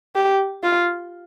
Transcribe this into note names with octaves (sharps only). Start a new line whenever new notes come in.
G4
F4